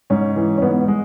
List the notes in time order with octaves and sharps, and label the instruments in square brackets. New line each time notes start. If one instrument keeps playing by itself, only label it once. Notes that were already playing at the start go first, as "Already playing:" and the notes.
[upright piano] G#2 C#4
E3
C#4
G#2 B3
G#3